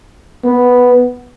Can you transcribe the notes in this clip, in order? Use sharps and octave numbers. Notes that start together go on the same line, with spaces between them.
B3